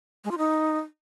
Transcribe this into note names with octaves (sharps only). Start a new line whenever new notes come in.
G#3
F4
D#4